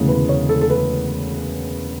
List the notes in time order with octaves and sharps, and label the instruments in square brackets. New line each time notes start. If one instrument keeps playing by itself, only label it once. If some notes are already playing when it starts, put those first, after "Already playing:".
Already playing: [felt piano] E1 D2 C#3 E3
B4
C#5
A4
A4
B4